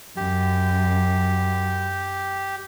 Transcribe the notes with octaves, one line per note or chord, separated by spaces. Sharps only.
F#2 G4